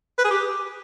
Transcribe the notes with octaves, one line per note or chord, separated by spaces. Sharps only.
B4
G#4
G4